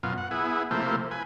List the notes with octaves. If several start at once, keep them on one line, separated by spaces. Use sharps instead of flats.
F#2 B2 F4
F#5
B3 E4 G#4
C3 F3 A3 A#3 E4 C5
B4 G#5